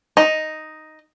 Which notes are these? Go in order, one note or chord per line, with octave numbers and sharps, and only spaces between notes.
D#4